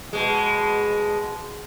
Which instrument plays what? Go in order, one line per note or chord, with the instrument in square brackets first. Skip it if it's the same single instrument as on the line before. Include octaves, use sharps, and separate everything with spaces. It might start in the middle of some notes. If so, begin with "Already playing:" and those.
[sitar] B2 G#3